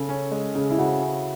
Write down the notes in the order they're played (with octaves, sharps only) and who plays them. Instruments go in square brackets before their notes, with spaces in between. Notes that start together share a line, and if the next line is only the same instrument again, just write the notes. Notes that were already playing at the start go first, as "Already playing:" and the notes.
Already playing: [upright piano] C#3 [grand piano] A4
[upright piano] C#4
G#3
[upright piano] C#3 [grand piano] G#4
[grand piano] E4
[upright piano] C#3 [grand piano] F#4
[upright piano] C#4